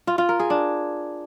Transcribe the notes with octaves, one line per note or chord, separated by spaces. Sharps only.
F4
F4
A#4
G#4
D4